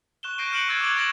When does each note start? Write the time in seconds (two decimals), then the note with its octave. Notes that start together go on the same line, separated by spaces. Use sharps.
0.23 C#6 F#6 E7 G7
0.38 C#6 G6 A#6 C7 D7 D#7
0.52 F6 F#6 C#7 D7 E7 F#7
0.68 C#6 E6 F6 G#6 A6
0.81 D6 F#6 A6 D7 F7 F#7
0.96 C#6 F#6 A6 A#6 E7 F#7